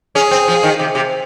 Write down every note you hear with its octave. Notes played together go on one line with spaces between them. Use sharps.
C#4 G#4
C4
F3
D#3
C3
C3